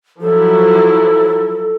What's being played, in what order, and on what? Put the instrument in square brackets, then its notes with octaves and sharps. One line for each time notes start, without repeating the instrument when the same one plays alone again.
[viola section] F3 F#3 E4 [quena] A4